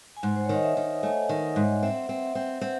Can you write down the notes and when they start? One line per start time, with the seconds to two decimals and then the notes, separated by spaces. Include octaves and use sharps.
0.17 G#5
0.23 G#2 F#5
0.36 C5
0.45 C#5
0.49 D#3 D#5
0.63 E5
0.77 D#3
1.03 A3 G#5
1.29 D#3
1.43 F#5
1.56 G#2
1.83 C4 E5
1.94 F#5
2.06 C4 E5
2.35 C4
2.61 C4 F#5